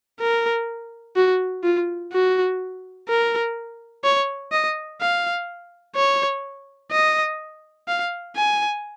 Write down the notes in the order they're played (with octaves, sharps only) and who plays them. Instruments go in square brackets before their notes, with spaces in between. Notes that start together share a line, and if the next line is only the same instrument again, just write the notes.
[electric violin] A#4
F#4
F4
F#4
A#4
C#5
D#5
F5
C#5
D#5
F5
G#5